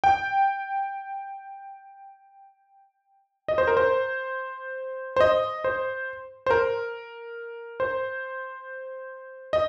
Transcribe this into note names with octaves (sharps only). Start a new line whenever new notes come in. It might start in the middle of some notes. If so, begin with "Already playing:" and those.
G5
D#5
C5
A#4
C5
C5
D#5
C5
C5
A#4
C5
D#5